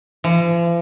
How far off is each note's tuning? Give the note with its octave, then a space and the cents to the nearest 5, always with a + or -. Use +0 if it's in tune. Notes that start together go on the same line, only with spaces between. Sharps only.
F3 -45